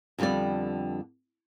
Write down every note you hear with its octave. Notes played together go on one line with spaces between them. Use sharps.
F2 D3 G3 B3 D5